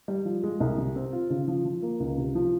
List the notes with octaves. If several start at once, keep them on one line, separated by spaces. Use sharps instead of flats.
G3
F3
G#3
C2
C3
C4
F4
C#3
F3
F3
A#3
C#2
C3
F3